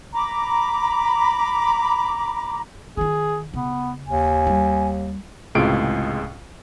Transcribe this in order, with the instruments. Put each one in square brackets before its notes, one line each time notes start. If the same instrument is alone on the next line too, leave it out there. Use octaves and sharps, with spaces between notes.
[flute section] A#5 B5 D6
[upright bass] D#3 F4 [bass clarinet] G#4
[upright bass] C#3 [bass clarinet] B3
[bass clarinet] D#2 [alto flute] G#5
[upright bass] G3
[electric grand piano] C#2 A2 C3 G#3 F4 D7